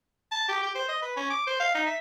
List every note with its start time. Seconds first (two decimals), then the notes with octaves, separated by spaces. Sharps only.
0.31 A5
0.48 G4
0.63 G4
0.75 C5
0.88 D#5
1.02 B4
1.16 C#4
1.30 D6
1.47 C5
1.60 F5
1.74 D#4
1.86 E5